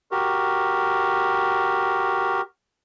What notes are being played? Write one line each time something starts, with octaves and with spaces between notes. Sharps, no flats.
F#4 G4 A#4